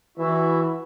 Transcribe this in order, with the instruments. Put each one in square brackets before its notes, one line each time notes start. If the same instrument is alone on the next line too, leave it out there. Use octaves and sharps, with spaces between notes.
[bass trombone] E3 [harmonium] E4 F#4 E5